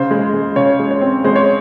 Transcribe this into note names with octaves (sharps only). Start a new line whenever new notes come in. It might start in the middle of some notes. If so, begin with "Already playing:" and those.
Already playing: C#3 C5
G#3
G#3
C#3 C#5
G#3
C#5
C4
G#3 C5
C#5